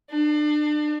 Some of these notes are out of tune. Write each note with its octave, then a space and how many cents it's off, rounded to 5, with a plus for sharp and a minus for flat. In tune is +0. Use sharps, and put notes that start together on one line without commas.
D4 +35